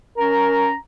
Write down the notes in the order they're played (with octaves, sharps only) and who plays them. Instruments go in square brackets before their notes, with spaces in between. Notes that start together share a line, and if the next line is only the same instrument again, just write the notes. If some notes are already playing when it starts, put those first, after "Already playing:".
[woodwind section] C#4 A#5 [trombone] A#4